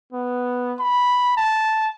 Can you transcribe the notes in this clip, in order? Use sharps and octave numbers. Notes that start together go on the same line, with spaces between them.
B3
B5
A5